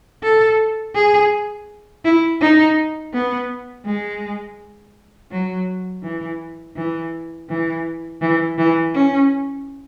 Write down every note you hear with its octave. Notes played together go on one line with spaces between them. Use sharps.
A4
G#4
E4
D#4
B3
G#3
F#3
E3
E3
E3
E3
E3
C#4